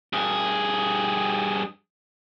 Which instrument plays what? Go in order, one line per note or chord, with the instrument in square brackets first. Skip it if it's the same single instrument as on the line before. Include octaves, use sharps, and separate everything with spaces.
[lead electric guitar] G2 G#4